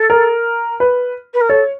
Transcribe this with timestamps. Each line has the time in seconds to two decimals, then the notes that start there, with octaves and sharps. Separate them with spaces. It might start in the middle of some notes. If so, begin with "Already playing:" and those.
Already playing: A4
0.10 A#4
0.80 B4
1.34 B4
1.41 A#4
1.49 A4 C#5